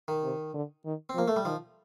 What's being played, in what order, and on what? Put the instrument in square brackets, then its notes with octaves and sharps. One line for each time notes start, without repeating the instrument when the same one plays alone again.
[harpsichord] D#3
[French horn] C3
D3
D#3
[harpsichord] C4
[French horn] F3 [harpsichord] A#3
[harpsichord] A3
G3
[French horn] D#3 [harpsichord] F3